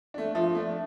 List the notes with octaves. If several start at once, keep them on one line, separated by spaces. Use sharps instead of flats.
A3 D4
F3 E5
A3 D4